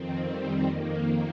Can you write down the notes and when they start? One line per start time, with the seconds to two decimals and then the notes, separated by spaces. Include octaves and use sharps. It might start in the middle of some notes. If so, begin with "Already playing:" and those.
Already playing: F2 D#3 C4
0.27 G3
0.67 F2 D#3 A#3